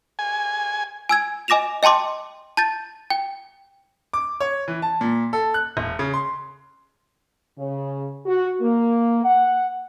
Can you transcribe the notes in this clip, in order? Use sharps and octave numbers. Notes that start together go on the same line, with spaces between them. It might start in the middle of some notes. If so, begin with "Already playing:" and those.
G#5
G#5 E6 G#6
D#5 G#5 D6 A#6 E7 F7
D#5 G5 A5 C6 D6
A5 G6 A6
G5
D6
C#5
E3
A5
A#2
A4
F#6
E1
C#3
C6
C#3
F#4
A#3
F#5